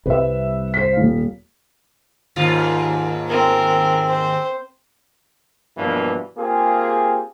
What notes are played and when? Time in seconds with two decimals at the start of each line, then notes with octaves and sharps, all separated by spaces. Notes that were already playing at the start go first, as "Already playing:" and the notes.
0.06 C2 G3 C4 B4 E5
0.74 C5 B6
0.93 D#1 F5
2.36 D#2 G#2 F4
3.29 C4 A#4
4.08 C5
5.77 G2 B2 E3 F3 A#3 D4
6.37 A#3 C4 F4 G4 G#4